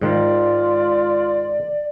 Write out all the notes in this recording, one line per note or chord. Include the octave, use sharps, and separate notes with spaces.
G#2 D#3 F4 D5